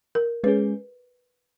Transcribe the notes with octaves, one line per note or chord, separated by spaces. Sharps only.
A#4
G#3 C#4 G#4 B4